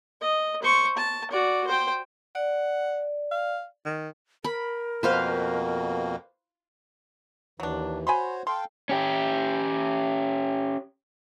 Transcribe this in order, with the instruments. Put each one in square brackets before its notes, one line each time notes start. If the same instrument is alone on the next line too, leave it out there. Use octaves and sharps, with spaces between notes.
[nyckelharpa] D#5
C5 C#6
A5
F#4 D5
C5 G5
[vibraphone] D5 [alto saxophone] F#5
[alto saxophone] F5
D#3
[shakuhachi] A#4 [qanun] B5
[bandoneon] F2 B2 A#3 [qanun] B4 C5 F5
[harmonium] D#2 E3 [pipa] F#3 D4
[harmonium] F#4 C5 C#5 [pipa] G#5 B5 C6
[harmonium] A4 F5 G5 [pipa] C6
[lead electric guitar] C#4 G4